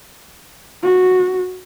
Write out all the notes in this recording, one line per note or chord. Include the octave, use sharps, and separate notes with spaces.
F#4